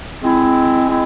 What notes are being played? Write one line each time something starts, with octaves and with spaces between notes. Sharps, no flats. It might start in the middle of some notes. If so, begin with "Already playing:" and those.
G#3 C4 E4
G#3 C4 E4